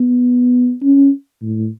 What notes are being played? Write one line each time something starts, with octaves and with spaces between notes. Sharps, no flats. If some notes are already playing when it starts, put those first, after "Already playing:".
Already playing: B3
C#4
A2